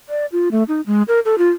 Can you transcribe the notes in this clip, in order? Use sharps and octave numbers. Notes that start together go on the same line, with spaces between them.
D5
F4
A3
D#4
G#3
A#4
A4
F4